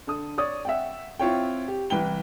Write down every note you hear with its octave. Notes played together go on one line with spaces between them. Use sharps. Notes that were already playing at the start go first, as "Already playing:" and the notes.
D3 A4 D#6
C#5 D5 D#6
E5 F#5 G5
C4 E4 F4 C#5 G5
G4
C2 E3 B4 G5 G7